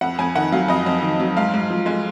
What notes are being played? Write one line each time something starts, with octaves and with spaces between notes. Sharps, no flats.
F2 F#5
F2 G#5
D#3 F#5
F#3 F5
F2 D#5
F2
D#3
F#3
G#2 F5
G#2
F3
G#3